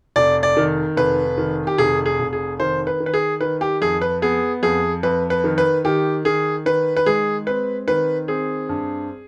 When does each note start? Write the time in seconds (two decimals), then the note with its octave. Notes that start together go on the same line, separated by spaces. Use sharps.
0.16 F1 D5
0.43 D5
0.57 D#3
0.97 F1 B4
1.38 D#3
1.67 G4
1.78 F1 G#4
2.06 G#4
2.19 F1
2.33 G#4
2.60 D#3 C5
2.87 B4
3.00 D#3
3.06 B4
3.14 G#4
3.41 D#3 B4
3.61 G4
3.81 F2 G#4
4.01 B4
4.22 B3 G#4
4.63 F2 G#4
5.03 F2 B4
5.30 B4
5.44 D#3
5.58 B4
5.85 D#3 G4
6.25 D#3 G#4
6.66 D#3 B4
6.96 B4
7.06 G#3 G#4
7.47 C4 B4
7.88 D#3 B4
8.28 C4 G#4
8.69 G2